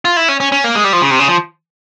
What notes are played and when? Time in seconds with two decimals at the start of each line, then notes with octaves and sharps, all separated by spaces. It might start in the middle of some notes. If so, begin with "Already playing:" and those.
0.05 F4
0.17 E4
0.28 C#4
0.40 C#4
0.52 C#4
0.64 A#3
0.75 G#3
0.84 G3
0.93 F3
1.02 C#3
1.11 C3
1.19 C#3
1.28 F3